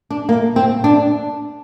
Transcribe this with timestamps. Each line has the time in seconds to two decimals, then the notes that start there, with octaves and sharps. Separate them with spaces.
0.10 D4
0.29 A#3
0.56 C4
0.84 D4